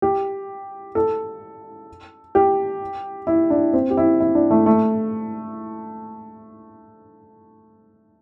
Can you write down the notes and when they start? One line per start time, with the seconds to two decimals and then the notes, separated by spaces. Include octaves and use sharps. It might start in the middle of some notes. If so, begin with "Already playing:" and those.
0.02 G4
0.95 A4
2.35 G4
3.27 E4
3.50 D4
3.74 C4
3.90 G4
3.97 E4
4.20 E4
4.35 D4
4.51 A3
4.66 A3